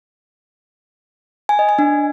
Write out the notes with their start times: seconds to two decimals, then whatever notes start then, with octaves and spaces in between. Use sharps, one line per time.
1.49 G#5
1.59 D#5
1.69 G#5
1.79 D4